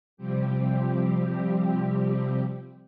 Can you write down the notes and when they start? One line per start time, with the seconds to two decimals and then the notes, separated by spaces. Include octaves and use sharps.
0.17 C3 F3 G3 C4 G4